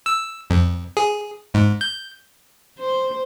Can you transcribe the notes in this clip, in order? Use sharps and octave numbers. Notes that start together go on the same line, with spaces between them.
E6
F2
G#4
G#2
G6
C5